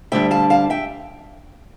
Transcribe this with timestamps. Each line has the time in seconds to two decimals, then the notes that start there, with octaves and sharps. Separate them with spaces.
0.12 D2 D3 G3 D4 E5 G5
0.31 F5 A5
0.50 F5 A5
0.70 E5 G5